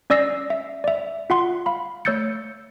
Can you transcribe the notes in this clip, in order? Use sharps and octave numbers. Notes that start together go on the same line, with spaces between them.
C#4 D5 E6 A#6 C7
E5
D5 E5
F4 F#5 C6
F5 B5
A3 C#5 E6 G6 A6 C#7